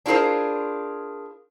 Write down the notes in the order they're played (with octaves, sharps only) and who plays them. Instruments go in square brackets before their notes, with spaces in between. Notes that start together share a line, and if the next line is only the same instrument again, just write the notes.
[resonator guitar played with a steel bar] D4 E4 F4 G#4 A#4 C5